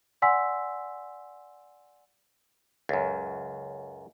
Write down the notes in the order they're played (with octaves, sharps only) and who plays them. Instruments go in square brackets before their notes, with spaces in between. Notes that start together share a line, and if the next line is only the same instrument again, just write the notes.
[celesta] D5 F#5 G#5 C6 E6 B6
[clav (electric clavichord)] C#2 F#2